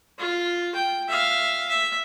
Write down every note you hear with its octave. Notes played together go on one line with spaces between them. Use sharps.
F4
G5
E5 F5
E5